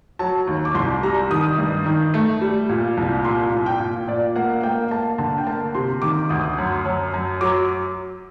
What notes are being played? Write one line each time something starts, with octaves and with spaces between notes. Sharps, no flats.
F#3 A5
D#2
D6
C2 C6
G3 A#5
D#3 D#6
G2
D#3
A3
G3
A#2
C2
A#2 C6
A#2
G5
A#2
A#2 D5
A#3 F#5
A#3 G5
A#3 A5
D3 A5
G5
A#3 A5
C3 C6
D#3 D6
D2 D#6
F#2
F#2
F#2
F#3 D6